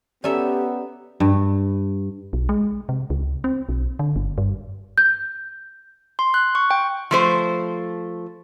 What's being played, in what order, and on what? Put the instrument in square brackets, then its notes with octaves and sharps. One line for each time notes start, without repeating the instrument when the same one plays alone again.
[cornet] B3 [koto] C#4 A4 E5 [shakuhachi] G4 [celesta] D5 A#5
[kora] G2
[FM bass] B1
G#3
C3
C#2
C4
B1
D3
G1
G2
[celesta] G6
[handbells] C6
F#6
C#6
G5
[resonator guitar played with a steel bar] F3 A3 C5